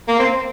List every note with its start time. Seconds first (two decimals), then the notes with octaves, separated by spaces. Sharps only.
0.08 A#3
0.19 C4